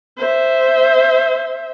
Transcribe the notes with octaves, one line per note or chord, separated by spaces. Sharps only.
C5 E5